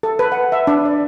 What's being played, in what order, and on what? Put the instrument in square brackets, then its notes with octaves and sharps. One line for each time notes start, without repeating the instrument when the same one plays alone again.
[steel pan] A4
B4
F#5
E5
D4
D5